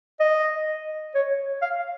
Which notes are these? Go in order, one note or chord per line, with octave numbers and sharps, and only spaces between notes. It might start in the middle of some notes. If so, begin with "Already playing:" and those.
D#5
C#5
F5